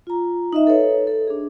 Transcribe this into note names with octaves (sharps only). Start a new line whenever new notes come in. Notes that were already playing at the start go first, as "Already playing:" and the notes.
F4 A#5
D#4 D#5 E5
A4 B4 C#5
A4
D4 G#4